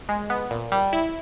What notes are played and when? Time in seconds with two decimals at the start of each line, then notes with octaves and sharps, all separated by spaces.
0.09 G#3
0.30 B3
0.51 A#2
0.72 G3
0.93 E4